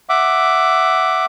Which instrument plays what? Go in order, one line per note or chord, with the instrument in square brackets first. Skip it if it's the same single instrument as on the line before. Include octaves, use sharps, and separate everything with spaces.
[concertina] E5 F#5 D6